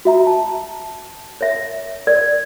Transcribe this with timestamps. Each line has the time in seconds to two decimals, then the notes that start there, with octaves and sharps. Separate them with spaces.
0.05 F#4 E5 A#5
0.27 A5
1.41 C#5 E5
2.07 D5 G#6